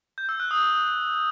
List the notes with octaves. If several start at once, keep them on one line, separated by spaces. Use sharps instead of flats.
G6
E6
F#6
D#6
D#6